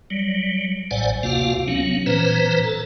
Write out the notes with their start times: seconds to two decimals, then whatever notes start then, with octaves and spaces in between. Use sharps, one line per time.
0.10 F#3 G3
0.91 A1 A2 C5 D5 F#5 G#5
1.23 D2 C3 A#3 F4 F#4 F5
1.68 F#3 B3 C#4
2.06 A#2 E3 B4 C5 A#5
2.64 A4